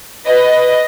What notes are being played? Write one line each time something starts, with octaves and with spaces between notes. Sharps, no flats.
B4 D#5